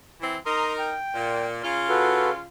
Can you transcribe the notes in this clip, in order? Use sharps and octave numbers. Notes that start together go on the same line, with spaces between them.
E3 C4 E4
D#4 A#4 A#5 C6 D#6
G5
A#2
C#3 F4
F#4 A4 B4